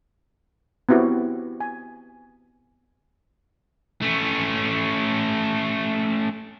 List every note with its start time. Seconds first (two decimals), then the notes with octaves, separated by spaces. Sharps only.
0.89 B3 C4 E4 F#4 G4
1.61 G#5
4.02 A3 C#4